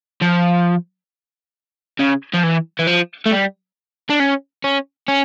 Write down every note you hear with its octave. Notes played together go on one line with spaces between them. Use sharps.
F3
C#3
F3
E3
E3
F3
A3
G3
D4
C#4
C#4
C#4